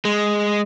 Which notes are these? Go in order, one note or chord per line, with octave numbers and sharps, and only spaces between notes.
G#3